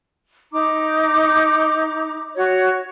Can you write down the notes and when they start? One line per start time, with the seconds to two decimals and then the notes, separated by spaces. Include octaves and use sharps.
0.52 D#4 A#5 D6
2.37 F#4 C#5